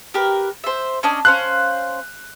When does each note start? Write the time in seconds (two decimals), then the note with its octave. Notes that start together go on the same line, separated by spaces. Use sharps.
0.14 G4 A#4 B4
0.64 C5 E5
1.03 C#4 D4 D#5
1.25 C#4 C5 F5 F#6